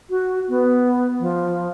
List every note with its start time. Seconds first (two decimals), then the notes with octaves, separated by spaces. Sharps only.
0.10 F#4
0.49 B3
1.20 F3